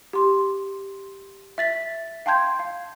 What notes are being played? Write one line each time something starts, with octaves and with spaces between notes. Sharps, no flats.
G4 C6
E5 A6 B6
F5 G5 A5 C6 G6 G#6
F5